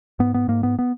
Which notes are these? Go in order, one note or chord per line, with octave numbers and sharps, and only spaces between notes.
G#2 B3
B3
G#2 A#3
B3
B3